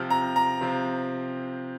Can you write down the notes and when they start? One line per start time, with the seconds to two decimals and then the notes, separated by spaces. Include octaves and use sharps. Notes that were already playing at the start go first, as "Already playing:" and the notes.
Already playing: C3 F3 C4 F6
0.10 A#5
0.36 A#5
0.61 C3 F3 C4